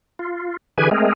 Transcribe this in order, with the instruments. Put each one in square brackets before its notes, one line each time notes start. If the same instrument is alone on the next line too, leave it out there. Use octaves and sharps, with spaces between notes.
[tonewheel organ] F4
D3 E3 G4 G#4 B4 G#5
G#3 A3 C4 G#4 A#4